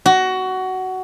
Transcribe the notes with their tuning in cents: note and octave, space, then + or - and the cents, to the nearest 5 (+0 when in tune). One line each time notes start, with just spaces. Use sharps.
F#4 +15